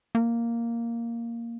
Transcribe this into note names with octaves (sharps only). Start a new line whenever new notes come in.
A#3